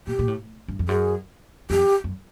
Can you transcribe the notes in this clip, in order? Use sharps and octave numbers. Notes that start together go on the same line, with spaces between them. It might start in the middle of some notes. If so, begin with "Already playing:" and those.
A#2 G4
A#2
A2
G2
F2
F#2 G#4
F2 G4
F#2